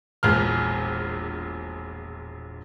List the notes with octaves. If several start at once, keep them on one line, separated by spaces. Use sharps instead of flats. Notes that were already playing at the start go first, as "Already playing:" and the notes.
E1 A#1 F6